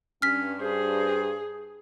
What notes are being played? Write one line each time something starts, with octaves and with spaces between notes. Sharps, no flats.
G2 C#4 F6 B6
G#4 C5